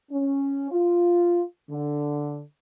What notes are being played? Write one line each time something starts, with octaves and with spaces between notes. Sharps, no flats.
C#4
F4
D3